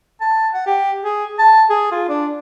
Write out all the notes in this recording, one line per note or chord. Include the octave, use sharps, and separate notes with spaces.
A5
F#5
G4
G#4
A5
G#4
F4
D4